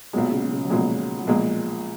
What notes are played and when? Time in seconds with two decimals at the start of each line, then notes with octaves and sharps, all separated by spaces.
0.13 B1 A#2 F#3 G#3
0.32 C#3
0.43 B2
0.51 C#3
0.65 F#3
0.70 B1 A#2 F3 G#3
1.19 F#3
1.27 B1 A#2 F3 G#3